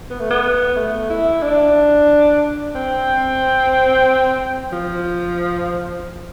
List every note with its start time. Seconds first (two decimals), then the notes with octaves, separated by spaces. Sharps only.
0.10 B3
0.20 A3
0.30 B3
0.76 A3
1.10 E4
1.42 D4
2.75 C4
4.72 F3